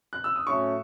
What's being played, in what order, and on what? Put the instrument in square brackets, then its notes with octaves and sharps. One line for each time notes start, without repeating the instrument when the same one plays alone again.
[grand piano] F#6
E6
D#6
[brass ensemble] A2 F#3 A3 C#4 [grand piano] C#6